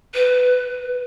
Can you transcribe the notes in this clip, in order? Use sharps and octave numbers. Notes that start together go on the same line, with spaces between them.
B4